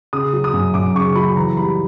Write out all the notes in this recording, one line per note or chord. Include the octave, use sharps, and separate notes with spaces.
C#3 D#6
F#3
D#6
F#2
F#2 D6
C#3 C#6
F#3 B5
E3 A#5
G3 B5